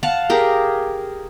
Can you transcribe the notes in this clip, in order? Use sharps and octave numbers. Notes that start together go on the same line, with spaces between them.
F5 F#5 A5
G4 G#4 A#4